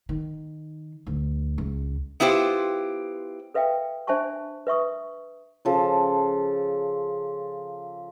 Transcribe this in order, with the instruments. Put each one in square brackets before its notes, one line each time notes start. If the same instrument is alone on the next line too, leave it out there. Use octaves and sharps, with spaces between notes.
[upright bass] D#3
D2
C#2
[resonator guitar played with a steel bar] B3 E4 F4 G4 C5
[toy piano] A4 B4 E5 F5 G5
D4 C5 E5 G#5 A5 C#6
B4 E5 C#6 D#6
[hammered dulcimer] C#3 F3 A4